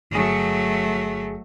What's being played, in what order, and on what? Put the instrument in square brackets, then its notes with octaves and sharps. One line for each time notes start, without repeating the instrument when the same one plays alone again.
[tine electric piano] G1 G#4 [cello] F#3 A3